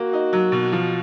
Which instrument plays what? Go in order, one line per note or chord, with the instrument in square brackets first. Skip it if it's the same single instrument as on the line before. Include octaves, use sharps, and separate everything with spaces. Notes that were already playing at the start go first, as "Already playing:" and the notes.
Already playing: [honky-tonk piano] A#3 [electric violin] F#4
[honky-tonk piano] D#4
F#3
B2
F3